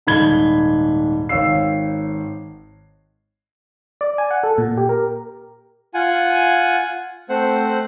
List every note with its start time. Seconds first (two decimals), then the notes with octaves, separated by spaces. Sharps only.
0.07 D#1 G#2 B5 G#6 G7
1.29 G#1 C#5 F5 E6 C7
4.01 D5
4.18 G#5
4.31 F#5
4.43 A4
4.58 A#2
4.77 G4
4.89 A#4
5.94 F4 F#5 G#5
7.29 A3 C4 C5 F#5